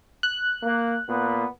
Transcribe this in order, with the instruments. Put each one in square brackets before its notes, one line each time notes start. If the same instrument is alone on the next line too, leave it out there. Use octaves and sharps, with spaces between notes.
[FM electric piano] F#6
[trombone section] A#3
A#2 B3